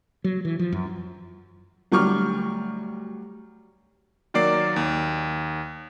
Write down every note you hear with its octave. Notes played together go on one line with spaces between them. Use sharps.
F#3
E3
F3
F#2
D2 F#3 G3 C#6 D6 F6
D#3 F#3 A#3 D5 D6 C7
D#2